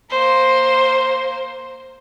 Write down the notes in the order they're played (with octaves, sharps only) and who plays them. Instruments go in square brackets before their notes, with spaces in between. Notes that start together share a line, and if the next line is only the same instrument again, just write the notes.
[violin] A#3 C5